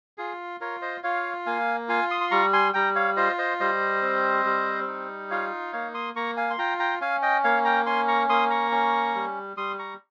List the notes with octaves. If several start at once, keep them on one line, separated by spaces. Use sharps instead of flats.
F4 G#4
F4 A#4 C#5
C5 D#5
F4 C#5 F5
A#3 F5 G#5
F4 F5 G#5
C6 D#6
C6
G3 A#5 C#6
G#5 C6
G3 G5 A#5
C#5 F5
F4 C5 D#5
C5 D#5
G3 C5 D#5
C4
G3
D#4
F4 C#5 F5
A#3 C#5 F5
C6 D#6
A#3 A#5 C#6
F5 G#5
C6
F4 G5 A#5
G5 A#5
C#4 F5 G#5
D#5 G5
A#3 C#5 F5
G5 A#5
C#4 G#5 C6
A#5 C#6
A#3 C6 D#6
A#5 C#6
C#4
G3
G3 C6 D#6
A#5 C#6